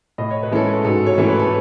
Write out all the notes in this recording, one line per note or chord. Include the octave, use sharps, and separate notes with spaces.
A2 D#5
C#5
B4
E3 G#3 C#4 E4 A4 C#5
G#2 F#4 A4
A4 C#5
E3 A3 C#4 E4
B4
A4